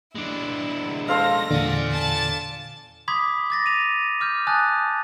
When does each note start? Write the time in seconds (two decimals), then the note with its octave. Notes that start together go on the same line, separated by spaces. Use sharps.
0.15 G#3 D4 E4
1.08 A4 C5 F5 A#6
1.51 E2 A#2 D3 D5 G#5
1.92 A5 A6
3.08 B5 C6 D6 D#6 G#6 B6
3.50 D6 A6 A#6
3.66 D#7 F7
4.20 D6 F6 G6
4.47 G#5 A5 D#6 F#6 A6